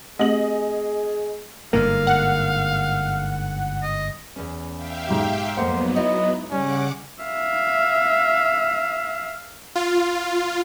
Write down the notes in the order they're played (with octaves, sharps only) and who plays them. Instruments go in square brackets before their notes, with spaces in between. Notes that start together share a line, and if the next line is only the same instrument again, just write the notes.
[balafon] A3 C4 G4 [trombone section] G#4 [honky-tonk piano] D#5 F#7
[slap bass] G1 G#2 D3 [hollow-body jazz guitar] A#3 [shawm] F5
[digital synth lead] F#5
[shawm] D#5
[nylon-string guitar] E2 C#4
[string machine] E5 F5 G5
[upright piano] B1 G#2 [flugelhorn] G4
[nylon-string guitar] F2 A#3 F#5 [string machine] F#3 B3 [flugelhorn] C5
[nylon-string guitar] D#4 E4 [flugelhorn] D#5
[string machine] C#3 F#5 D6 [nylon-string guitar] G3 [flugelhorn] C#4
[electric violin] E5 F5
[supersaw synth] F4